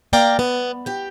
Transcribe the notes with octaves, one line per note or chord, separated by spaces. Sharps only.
A#3 D5 F5 G5 A#5
B3
G4 G5